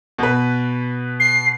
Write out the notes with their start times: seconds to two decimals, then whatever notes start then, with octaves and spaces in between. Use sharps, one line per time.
0.18 B2 B4
1.20 C7